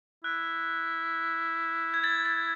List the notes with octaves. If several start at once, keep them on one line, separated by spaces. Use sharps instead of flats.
E4 F#6
G#6
A6
A6